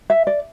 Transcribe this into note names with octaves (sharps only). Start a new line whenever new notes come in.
E5
D5